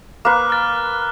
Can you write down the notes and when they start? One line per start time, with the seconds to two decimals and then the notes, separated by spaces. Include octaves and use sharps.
0.25 A#3 B4 D6 F#6
0.50 F6 A6